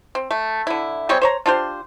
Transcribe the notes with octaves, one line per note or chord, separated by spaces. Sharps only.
C4
A3
D3 E4
G3 G#3 C4 C#5
C5 C#5 A#5
D4 F4 G4 C5